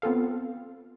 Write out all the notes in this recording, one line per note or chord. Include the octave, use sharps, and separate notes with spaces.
B3 C4 F4 A4 F5